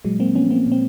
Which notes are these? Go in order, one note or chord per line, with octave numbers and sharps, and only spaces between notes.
A#2 F#3 G#3
A#3 C4
F3 B3 C#4
A#3 C4
A#2
C4